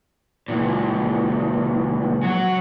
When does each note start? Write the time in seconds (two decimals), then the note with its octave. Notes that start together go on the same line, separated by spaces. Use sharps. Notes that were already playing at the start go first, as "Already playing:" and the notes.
0.48 C#2 A#2
2.23 F#3 F#4